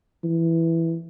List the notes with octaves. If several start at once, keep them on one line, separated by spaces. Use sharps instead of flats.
E3